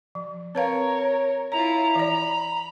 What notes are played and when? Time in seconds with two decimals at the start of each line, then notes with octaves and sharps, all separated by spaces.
0.15 F3
0.55 C4 A#4 B4 C#5 F5
1.52 E4 F4 C#5 A#5
1.96 E3 D5 B5